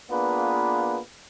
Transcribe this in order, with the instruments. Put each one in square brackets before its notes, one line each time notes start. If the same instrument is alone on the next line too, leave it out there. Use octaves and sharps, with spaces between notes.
[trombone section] A#3 B3 D4 F4 G#4 B4